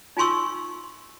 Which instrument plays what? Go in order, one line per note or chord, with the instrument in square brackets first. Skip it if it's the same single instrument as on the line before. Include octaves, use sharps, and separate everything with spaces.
[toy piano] D#4 F4 G#5 C6 C#6 E6